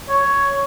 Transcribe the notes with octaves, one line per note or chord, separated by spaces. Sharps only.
C#5